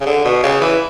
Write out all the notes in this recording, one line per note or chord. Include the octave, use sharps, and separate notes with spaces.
C#3
D3
B2
C#3
E3